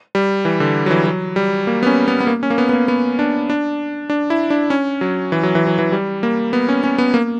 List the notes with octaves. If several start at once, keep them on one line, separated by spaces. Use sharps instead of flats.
G3
E3
D3
F#3
E3
F#3
G3
A#3
B3
C#4
B3
B3
A#3
C#4
A#3
B3
B3
A#3
B3
D4
D4
D4
E4
D4
C#4
F#3
E3
F#3
E3
F#3
E3
G3
A#3
B3
C#4
C#4
B3
A#3